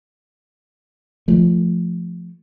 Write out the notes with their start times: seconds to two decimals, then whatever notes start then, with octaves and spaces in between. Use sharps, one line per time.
1.28 F3 A3